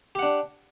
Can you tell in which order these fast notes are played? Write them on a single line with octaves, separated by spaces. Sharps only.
G4 F#5 D4